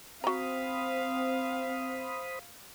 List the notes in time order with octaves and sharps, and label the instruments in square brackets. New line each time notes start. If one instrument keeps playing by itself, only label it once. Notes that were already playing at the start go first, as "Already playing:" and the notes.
[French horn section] C4 [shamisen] F#4 A#5 [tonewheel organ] C5 B5 D#6 [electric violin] F5